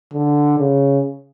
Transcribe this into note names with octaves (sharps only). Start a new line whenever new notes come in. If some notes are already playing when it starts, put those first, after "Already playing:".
D3
C#3